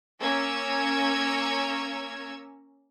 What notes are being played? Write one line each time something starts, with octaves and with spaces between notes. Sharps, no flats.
A#3 C#4 A#4 C#5 E6 G#6